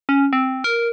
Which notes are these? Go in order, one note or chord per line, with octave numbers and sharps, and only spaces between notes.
C#4
C4
A#4